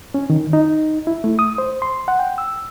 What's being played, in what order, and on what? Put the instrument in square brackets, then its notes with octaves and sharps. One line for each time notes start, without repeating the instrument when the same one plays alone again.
[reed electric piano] C#4
D#3
D#4
E4
A3
D#6
C5
C6
F#5
G5
E6